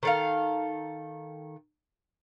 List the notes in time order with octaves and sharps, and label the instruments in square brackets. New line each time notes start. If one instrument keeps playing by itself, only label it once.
[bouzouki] D#3 A4 F5